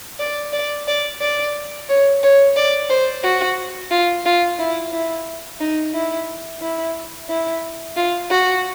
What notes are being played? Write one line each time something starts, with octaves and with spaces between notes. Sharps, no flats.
D5
D5
D5
D5
C#5
C#5
D5
C5
F#4
F4
F4
E4
E4
D#4
E4
E4
E4
F4
F#4